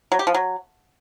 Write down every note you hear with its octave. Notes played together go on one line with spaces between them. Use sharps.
F#3
G4
F3
F#3